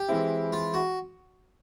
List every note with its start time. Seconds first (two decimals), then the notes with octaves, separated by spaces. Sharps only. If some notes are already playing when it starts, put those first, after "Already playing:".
Already playing: G4
0.09 E3 G#3 C4 E4
0.52 F4
0.74 F#4